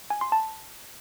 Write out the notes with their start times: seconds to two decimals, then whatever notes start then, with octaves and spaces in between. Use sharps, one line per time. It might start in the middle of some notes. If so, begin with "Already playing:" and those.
0.10 G#5
0.21 C6
0.32 A5